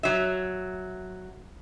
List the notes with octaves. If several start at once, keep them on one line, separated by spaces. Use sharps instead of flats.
F#3 E5